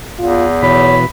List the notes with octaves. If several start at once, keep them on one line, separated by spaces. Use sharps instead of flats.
E2 F4
B2 E3 C#5 B5